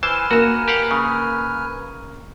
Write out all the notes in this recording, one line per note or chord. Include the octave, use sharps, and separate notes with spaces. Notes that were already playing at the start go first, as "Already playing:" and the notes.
E3 B4 C5 G#5 A5 F6
A#3 F#4 E7
G4 F5 F#5
C#3